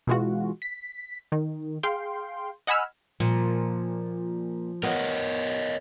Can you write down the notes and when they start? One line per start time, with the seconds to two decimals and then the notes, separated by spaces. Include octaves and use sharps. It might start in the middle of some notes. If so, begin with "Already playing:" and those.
0.07 B2 E3 G#3 F4 F#4
0.62 B6
1.32 D#3
1.83 G#4 F5 G5 C6
2.67 D#5 F#5 G#5 B5 E6 F6
3.20 A#2 F3
4.83 B3 A#4 C#5 D#5